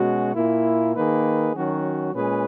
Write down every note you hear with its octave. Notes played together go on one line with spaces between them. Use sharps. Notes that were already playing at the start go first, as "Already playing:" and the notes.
Already playing: B2 G#3 C#4 F#4
A#2 A#3 E4
D#3 A#3 D#4 G#4 B4
D#3 F#3 C#4 F#4
A#2 G#3 C#4 G#4 B4